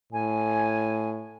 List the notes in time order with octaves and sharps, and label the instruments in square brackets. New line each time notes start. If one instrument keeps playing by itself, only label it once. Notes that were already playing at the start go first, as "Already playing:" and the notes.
[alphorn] A2 [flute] G#5